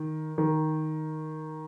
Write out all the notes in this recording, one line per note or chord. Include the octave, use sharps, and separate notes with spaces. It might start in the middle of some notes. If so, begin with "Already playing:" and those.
Already playing: D#3
D#3